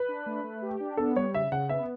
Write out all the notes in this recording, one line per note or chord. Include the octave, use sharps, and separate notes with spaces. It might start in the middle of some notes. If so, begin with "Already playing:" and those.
Already playing: B4
D4
A3
A3
G4
D4
B3 A4
G3 C#5
C#3 E5
C#3 F#5
B3 E5